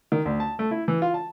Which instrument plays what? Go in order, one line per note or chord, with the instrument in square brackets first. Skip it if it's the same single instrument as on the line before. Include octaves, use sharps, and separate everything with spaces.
[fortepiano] D#3
D2
A5
A3
E4
E3
F4
A5